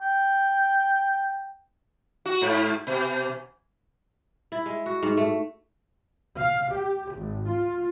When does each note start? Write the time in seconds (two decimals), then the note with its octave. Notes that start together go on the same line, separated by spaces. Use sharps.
0.02 G5
2.26 F#4
2.41 G#2
2.87 B2
4.52 E4
4.66 G#3
4.86 F#4
5.03 G#2
5.17 A3
6.36 F5
6.71 G4
7.14 G#1
7.48 F4